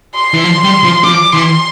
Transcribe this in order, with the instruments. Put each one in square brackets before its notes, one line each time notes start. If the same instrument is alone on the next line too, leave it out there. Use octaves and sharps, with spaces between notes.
[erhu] C6
[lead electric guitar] E3
F3
G3
F3
[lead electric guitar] F3 [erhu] D6
[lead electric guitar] E3 [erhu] C6